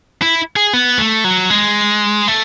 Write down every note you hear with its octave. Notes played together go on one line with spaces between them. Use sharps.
E4
G#4
B3
A3
F#3
G#3
A3